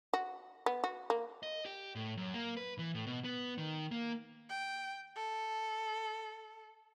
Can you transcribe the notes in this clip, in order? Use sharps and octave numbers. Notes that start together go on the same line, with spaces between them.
F#4
B3
F#4
A#3
D#5
G4
A2
F#2
A#3
B4
E3
A2
B2
B3
D#3
A#3
G5
A4